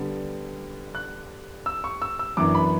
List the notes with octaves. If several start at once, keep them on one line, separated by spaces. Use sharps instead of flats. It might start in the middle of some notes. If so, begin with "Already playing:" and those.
Already playing: D3 G3 B3 D4
F#6
E6
C#6
E6
E6
F#2 E3 B3 D4 D6
B5